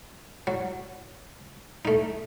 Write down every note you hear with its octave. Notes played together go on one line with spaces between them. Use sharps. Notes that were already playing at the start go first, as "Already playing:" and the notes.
F#3
A3 D#4